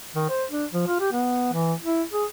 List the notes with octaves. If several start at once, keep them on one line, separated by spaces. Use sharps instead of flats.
D#3
C5
D4
F3
F4
G4
B3
E3
E4
G#4